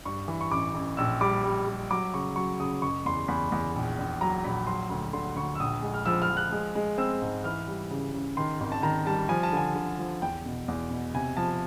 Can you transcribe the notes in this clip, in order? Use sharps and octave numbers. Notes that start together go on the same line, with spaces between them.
G2 C#6
E3
C#6
A1 D6
A1
A#1 E6
G3 D6
G3
G3
F#3 D6
C#3 C#6
F#3 C#6
C#3 D#6
F#1 C#6
E2 C6
E2 B5
E2
A#1
A#1
F#3 A#5
A#1 B5
F#3 C6
D2
D3 C6
D2 C#6
E6
A#1 D#6
G#3
F6
F3 E6
F6
F3
F#6
G#3
G#3
C4 E6
G#2
E3 F6
G3
C#3
C#3
D#3 C6
G#1
A5
D#3 A#5
G3 A5
F3 G#5
A5
D3 G#5
D3
F3
E2 G5
B2
E2
B2
C3 G#5
F3 A5